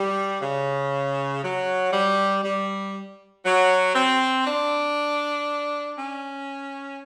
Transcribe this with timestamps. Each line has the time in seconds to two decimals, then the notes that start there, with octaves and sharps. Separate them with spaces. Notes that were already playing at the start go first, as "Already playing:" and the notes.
Already playing: G3
0.41 C#3
1.42 F#3
1.92 G3
2.43 G3
3.44 F#3
3.94 C4
4.45 D4
5.97 C#4